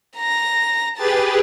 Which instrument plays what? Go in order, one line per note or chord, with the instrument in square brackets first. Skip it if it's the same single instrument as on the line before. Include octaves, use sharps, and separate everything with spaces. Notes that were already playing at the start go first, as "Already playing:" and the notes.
[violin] A#5 A#6
[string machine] G4 G#4 B4 [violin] A5 A6